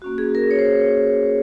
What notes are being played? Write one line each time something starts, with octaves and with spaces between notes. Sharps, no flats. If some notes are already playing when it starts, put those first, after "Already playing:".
A#3 C#4 F#4
G#4
A#4
C#5
C5